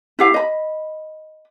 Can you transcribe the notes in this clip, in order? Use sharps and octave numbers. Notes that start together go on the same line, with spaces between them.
E4 G4 F5
D#5 B5